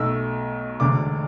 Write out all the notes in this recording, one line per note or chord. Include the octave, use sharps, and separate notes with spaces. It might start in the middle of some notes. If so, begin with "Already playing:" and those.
Already playing: B1 B2 A3 E6
E1 D2 D3 D6